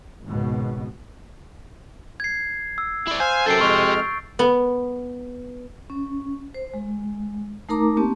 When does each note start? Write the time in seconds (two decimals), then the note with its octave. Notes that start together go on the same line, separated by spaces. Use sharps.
0.24 G#1 C#2 B2
2.20 G#6 C7
2.78 E6
3.07 E4 D5
3.20 C5 F5 G#5 G6
3.46 F#2 G4 A4 C5 A6 C7 D7
3.61 F2 G#3 C#6 E6 F6
4.39 B3
5.90 C#4
6.54 C5
6.74 G#3
7.69 A3 D#4 A#4 A#5 D6
7.97 A#3 C4 C#4 G4 A5